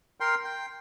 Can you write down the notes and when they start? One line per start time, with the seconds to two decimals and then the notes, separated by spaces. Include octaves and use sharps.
0.20 A#4 G5 C6
0.44 G5